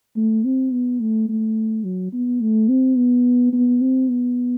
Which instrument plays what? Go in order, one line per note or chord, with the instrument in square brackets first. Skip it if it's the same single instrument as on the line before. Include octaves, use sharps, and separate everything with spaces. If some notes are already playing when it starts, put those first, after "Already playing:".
[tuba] A3
C4
B3
A3
A3
F#3
B3
A3
C4
B3
B3
C4
B3